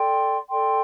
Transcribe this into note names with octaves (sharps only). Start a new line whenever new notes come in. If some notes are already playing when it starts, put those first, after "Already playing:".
Already playing: A4 D5 G5 C6
A4 D5 G5 C6